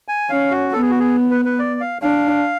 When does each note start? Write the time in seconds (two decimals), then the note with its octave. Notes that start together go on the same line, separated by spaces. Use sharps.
0.08 G#5
0.30 C#4 F5
0.51 F#4
0.73 B3 A4
0.82 G#4
0.90 F#4
1.00 G#4
1.31 B4
1.45 B4
1.59 D5
1.80 F5
2.02 D4 F5